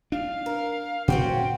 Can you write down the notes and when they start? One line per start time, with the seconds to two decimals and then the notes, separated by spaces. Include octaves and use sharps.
0.12 D4 F5
0.46 A#4
1.08 A#2 C4 C#4 F#4 G5